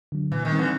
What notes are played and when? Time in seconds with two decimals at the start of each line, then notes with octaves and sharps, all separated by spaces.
0.12 D3 F#3
0.32 A#2 E3
0.45 D#3
0.51 G3 C4 D#4
0.58 D3 E3